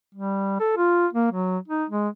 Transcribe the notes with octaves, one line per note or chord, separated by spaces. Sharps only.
G3
A4
F4
A#3
F#3
D#4
G#3